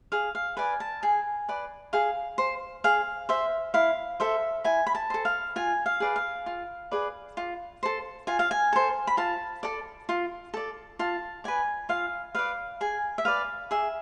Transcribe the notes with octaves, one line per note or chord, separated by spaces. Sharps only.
G#4 F5
F5
B4 D5 G#5
A5
G#4 G#5
B4 D5
G#4 F5
C5
G#4 F5
C5 E5
E4 F5
A4 C5 E5
E4 G#5
B5
A5
A4 C5
F5
F4 G#5
F5
G#4 B4 D5
F5
F4
G#4 B4 D5
F4
A4 C5
F4 G#5
F5
G#5
A4 C5
B5
F4 A5
A4 D5
F4
A4 D5
F4 A5
B4 D5 G#5
F4 F5
B4 D5 F5
G#4 G#5
E5
B4 D5 F5
G#4 E5